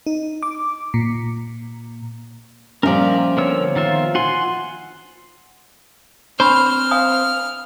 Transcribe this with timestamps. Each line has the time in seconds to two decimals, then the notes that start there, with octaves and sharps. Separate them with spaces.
0.07 D#4
0.43 D6
0.94 A#2
2.83 A#2 F3 G3 C#4 A#4 D5 E5
3.37 D3 B3 A#4 C#5 E6
3.76 D#3 F4 E5
4.15 F4 F#5 G#5 C6
6.40 C4 D4 C5 B5 C#6 F6
6.91 F5 G#5 D#6